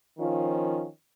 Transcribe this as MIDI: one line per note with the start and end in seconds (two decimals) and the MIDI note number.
0.18 0.86 51
0.18 0.86 53
0.18 0.86 61
0.18 0.86 65